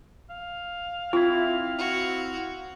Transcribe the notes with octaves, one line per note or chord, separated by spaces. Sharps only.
F5
C4 E4 F4
F#4